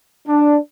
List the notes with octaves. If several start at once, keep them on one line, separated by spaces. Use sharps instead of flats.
D4